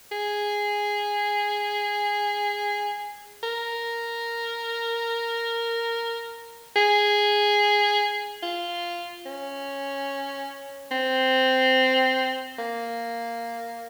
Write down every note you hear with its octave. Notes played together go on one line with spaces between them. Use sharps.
G#4
A#4
G#4
F4
C#4
C4
A#3